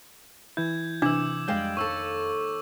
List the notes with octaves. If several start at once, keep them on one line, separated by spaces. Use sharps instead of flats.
E3 E4 G6 G#6
C3 E3 D4 D6 E6
F2 G3 G#3 F5 G5 G6
D#2 A4 C#6 E6